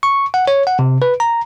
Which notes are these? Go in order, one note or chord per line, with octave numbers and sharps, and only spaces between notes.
C#6
F#5
C#5
F#5
C3
B4
A#5